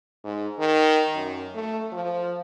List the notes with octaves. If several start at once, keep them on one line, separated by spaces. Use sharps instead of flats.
G#2
D#3
F#2
A3
F3